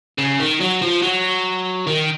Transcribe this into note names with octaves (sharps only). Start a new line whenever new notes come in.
C#3
D#3
F#3
F3
F#3
D#3